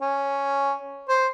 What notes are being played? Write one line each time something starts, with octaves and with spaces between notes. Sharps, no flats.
C#4
C5